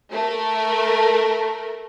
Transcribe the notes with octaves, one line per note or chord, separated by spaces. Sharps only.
A3 A#4